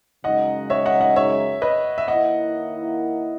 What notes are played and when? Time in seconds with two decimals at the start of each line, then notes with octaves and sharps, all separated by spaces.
0.24 F#2 C#3 G#3 D#4 D#5 F#5
0.70 C#5 E5
0.86 D#5 F#5
1.01 D#5 F#5
1.16 C#5 E5
1.62 B4 D#5
1.98 E5
2.08 D#3 A#3 E4 D#5 F#5